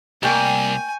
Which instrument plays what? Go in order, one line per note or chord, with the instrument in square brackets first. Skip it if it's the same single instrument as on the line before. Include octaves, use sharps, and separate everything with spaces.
[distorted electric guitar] C2 [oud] G3 A#3 A#4 [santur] G5 C#6 [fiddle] G#5